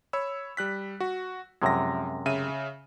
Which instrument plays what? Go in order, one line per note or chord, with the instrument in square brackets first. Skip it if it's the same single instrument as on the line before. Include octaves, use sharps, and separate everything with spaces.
[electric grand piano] C#5 B5 E6
G3 F#6 B6
F#4
[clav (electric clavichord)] F#2 C3 G#3 [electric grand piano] F3 A#6
[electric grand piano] C#3 E5 D#7